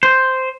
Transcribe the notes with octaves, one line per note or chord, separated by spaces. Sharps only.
C5